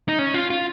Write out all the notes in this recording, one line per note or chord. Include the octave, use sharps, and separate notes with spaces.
D#4
C#4
F4
F4